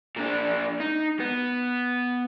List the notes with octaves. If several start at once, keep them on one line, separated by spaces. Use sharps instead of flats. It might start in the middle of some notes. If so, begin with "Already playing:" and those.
A#2 D4
D#4
B3